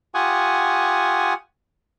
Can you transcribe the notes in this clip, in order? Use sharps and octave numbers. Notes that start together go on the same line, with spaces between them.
F4 G4 F#5 G#5 C#6 D#6